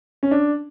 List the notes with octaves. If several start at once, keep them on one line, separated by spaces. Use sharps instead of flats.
C#4
D4